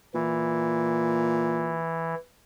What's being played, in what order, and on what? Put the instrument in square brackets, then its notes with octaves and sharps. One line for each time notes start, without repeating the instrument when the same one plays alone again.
[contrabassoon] A#2 [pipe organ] E3